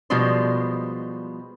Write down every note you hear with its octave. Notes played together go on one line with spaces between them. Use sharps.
B2 F3 G3 G#3 C5